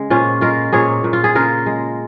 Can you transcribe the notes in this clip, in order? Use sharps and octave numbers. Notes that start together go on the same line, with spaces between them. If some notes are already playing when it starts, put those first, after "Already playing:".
Already playing: C#3 G#3
A#2 C#4 F4
G#3 F4 A#4
A#2 G#4 C#5
A#2
F4
G#4
C#3 F4 A#4
G#3